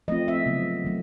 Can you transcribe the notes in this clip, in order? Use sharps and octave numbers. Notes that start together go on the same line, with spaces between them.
F3 A3 C4 F4 D#5
E5
C#3 F#3 B3
D#3 F#3 A3